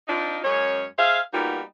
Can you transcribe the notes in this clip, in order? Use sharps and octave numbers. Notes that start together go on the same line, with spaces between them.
C4 D4 D#4 F4
F#2 G#3 C#4 C#5
G#4 C5 E5 F5
G3 A#3 B3 D#4 F4 F#4